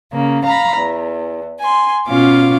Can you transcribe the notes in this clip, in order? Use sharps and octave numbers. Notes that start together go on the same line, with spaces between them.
C#3 A#3
F5 A#5 B5
E2
G#5 C6
B2 C#4 F4 F5 D6